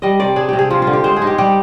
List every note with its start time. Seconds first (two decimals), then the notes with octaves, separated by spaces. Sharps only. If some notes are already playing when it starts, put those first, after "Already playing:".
0.02 G3 D#5
0.20 C3 D5
0.36 D4 G#4
0.49 C3 G4
0.59 G#4
0.70 F3 F4
0.82 F4
0.87 D3
0.93 G4
1.04 G#3 C5
1.16 G#4
1.22 D#4
1.27 G4
1.38 G3 G4